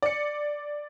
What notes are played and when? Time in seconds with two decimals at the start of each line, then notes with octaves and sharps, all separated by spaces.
0.02 D5 C#7